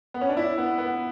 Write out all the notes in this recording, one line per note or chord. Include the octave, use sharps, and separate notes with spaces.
B3
C#4
D4
E4
B3
B3